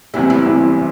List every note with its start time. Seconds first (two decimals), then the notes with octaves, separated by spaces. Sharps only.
0.14 F#1 E2 C3 E3 G3 E4
0.30 E4
0.46 F#1 E2 C3 E3 G3